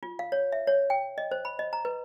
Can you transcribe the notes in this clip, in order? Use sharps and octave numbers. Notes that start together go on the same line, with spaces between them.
F4
F5
C#5
E5
C#5
G5
D#5
C5
B5
D#5
A#5
B4